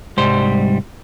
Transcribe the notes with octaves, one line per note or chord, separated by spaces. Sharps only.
C2 G#2 G3 C5